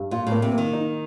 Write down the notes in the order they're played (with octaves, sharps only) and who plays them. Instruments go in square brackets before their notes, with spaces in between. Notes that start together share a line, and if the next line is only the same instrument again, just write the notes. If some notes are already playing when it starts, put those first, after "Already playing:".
Already playing: [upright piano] G2
[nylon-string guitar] A#2 [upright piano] F4
[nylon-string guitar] A2
[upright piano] A#3
[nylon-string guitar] C3
[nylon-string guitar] D#3 [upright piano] A#3
[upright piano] D#4